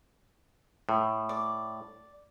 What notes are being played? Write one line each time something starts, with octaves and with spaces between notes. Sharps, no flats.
A2
D5